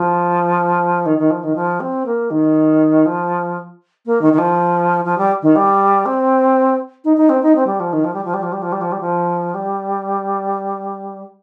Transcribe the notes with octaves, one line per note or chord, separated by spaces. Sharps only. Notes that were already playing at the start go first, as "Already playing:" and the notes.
Already playing: F3
D#3
D#3
F3
D#3
F3
C4
A#3
D#3
F3
A#3
D#3
D#3
F3
F3
G3
D#3
G3
C4
D#4
D#4
C4
D#4
C4
G3
F3
D#3
F3
G3
F3
G3
F3
G3
F3
G3
F3
G3
F3
G3